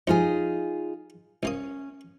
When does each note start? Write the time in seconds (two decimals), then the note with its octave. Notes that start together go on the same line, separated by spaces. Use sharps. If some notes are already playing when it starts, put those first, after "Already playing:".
0.07 F2 C3 D#4 F4 G#4
1.43 C2 A#3 C#4 D#6